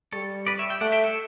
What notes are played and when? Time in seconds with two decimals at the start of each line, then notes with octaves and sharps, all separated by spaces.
0.13 G3 A4 C#5
0.47 B4 D5
0.59 C#5 E5
0.69 E5 G5
0.81 A3 D5 F#5
0.92 E5 G5
1.04 C#5 E5